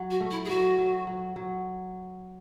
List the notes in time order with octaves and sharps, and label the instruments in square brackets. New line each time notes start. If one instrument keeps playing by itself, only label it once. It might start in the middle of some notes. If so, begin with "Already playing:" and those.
Already playing: [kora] F#3
[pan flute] F#4
[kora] A3
[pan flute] E4
G#4
[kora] F#3 [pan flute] F#4
[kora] F#3
F#3
F#3